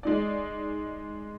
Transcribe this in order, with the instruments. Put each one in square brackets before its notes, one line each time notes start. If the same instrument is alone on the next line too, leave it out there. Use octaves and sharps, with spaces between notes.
[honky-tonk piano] G#3 D#4 D5